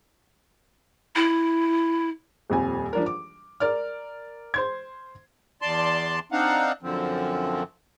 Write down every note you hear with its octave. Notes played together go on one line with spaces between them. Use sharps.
E4
D#1 F2 G#5
F3 D4 A#4
D6
A#4 D5 F6
C5 C6 G#6
E2 D5 A5 C6
C4 D4 D#4 F5 F#5
F#2 D3 F3 C4